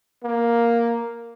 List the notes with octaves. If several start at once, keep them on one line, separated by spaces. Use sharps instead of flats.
A#3